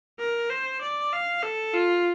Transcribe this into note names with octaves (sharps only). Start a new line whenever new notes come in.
A#4
C5
D5
F5
A4
F4